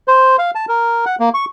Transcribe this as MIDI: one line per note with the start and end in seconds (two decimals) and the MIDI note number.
0.08 0.36 72
0.39 0.51 77
0.55 0.66 81
0.69 1.05 70
1.06 1.16 78
1.20 1.29 58
1.34 1.45 85